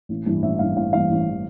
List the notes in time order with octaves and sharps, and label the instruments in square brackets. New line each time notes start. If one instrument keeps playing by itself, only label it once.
[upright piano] A1
G2 E3
A1 E5
G2 E3 F5
A1 F5
G2 E3 F5
A1
E3